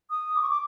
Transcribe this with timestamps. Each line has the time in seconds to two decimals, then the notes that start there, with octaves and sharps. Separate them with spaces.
0.10 D#6
0.35 D6
0.42 C#6
0.50 D6